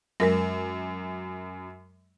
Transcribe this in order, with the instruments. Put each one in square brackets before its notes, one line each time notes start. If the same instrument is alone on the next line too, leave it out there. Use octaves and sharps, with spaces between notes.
[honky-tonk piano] F#2 [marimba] G#3 A#4 A#6